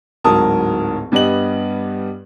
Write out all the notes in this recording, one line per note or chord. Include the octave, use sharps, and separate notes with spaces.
D1 G#2 F#3 A#4 A5 D#6
G2 G3 B3 D#5 F#7